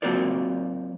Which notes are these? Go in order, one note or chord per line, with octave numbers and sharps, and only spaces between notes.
F#3 A#3 C4 F4 A#4 D5